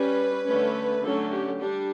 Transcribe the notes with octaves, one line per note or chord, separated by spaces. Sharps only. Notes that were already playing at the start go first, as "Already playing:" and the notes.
Already playing: G3 C#4 B4
D3 A3 C#4
D3 F#3 A3 C#4 A4
G4
G3 D4 G4